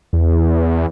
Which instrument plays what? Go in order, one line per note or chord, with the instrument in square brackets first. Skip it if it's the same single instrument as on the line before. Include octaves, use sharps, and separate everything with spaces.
[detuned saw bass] E2